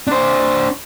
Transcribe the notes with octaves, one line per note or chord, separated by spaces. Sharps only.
D4 C5